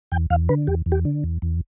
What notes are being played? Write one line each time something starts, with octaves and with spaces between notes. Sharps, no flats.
E2 G5
E2 F5
D3 B4
E2 G4
E2
G4
D3
E2
E2